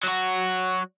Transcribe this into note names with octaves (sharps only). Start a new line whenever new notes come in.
F#3 F#4